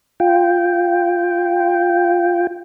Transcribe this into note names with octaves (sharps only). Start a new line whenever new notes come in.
F4 G5